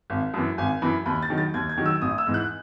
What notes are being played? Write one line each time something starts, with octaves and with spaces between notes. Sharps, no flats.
G#1
F#2 E3
G#1 G#5
F#2 E3 B5
D#2 B5
A6
D#3 F#3
A6
D#2 G#6
G#6
D#3 F#3
E6
A1 D#6
E6
G#2 E3
F#6